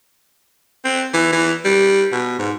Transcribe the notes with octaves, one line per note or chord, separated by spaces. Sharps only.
C4
E3
E3
G3
B2
G#2